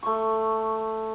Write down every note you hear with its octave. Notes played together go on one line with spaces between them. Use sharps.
A3 C#6